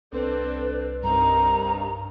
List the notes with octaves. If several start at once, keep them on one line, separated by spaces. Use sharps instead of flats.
C2 C4 D4 A4 B4
G2 C4 D#4 A#4 A#5